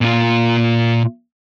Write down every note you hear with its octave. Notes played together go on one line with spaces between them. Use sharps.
A#2 F4